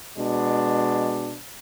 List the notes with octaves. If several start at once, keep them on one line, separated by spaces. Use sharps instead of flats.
B2 G#3 D4